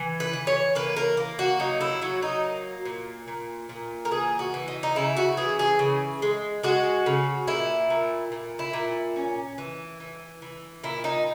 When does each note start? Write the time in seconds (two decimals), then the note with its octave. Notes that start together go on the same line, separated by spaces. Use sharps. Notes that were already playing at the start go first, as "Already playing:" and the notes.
Already playing: E3
0.20 B4
0.33 E3
0.47 C#5
0.75 A#3 B4
0.96 A#4
1.17 A#3
1.39 F#4
1.59 F#3 D#4
1.81 E4
2.02 F#3 F#4
2.22 D#4
2.44 A#3
2.85 A#2
3.28 A#2
3.69 A#2
4.05 A#4
4.11 E3 G#4
4.39 F#4
4.54 E3
4.68 D#4
4.83 D#4
4.96 C#3 E4
5.17 F#4
5.37 E3 G#4
5.59 G#4
5.79 C#3
6.22 G#3
6.63 G#3 F#4
7.06 C#3
7.48 A#2 E4
7.90 A#2
8.32 A#2
8.59 E4
8.73 A#2
9.16 C#4
9.58 E3
10.00 E3
10.42 E3
10.84 A#2 E4
11.04 D#4